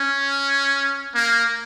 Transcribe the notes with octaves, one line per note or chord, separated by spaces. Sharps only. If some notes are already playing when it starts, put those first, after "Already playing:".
Already playing: C#4
A#3